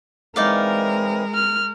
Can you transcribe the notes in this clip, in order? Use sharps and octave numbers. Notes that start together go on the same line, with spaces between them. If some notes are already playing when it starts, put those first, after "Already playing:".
E3 G#3 C4 D#4 E4 A#4 D5 F5
F6